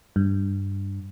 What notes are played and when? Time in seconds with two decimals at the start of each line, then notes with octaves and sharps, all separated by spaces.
0.16 G2